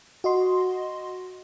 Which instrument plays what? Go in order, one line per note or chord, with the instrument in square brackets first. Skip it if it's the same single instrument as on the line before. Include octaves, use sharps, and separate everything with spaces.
[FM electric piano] F#4 D#5 C6